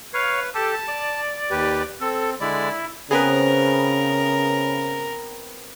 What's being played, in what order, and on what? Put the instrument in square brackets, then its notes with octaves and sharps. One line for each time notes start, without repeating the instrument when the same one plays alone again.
[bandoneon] B4 [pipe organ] C#5 F5
[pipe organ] G4 A4 [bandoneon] A5
[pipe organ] D5
[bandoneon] D#2 G4 B4
[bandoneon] C4 [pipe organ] A4
[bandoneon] D3 G#3 D5 [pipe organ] E4
[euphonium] C#3 [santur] B3 C4 [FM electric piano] G#4 B4 [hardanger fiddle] A#4